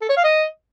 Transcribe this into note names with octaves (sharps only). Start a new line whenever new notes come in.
A4
C#5
F5
D#5